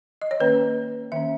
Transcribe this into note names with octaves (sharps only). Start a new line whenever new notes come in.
D#5
C#5
D#3 A#3 C#4 B4
D#3 A#3 C#4 E5